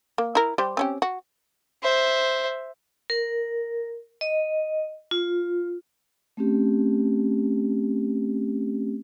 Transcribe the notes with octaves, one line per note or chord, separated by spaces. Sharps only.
A#3
E4 A#4
G3 G4 C5
C4 C#4 G4
F#4
C5 E5
A#4
D#5
F4
A3 C4 C#4 G4